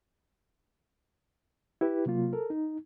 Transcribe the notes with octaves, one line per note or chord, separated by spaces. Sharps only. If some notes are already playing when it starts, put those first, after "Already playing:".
E4 G4 B4
C3 F#3 A#3 F4
A4 A#4
D#4